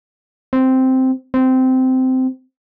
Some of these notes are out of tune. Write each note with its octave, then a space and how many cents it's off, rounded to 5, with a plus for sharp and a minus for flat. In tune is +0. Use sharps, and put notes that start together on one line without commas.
C4 -5
C4 -15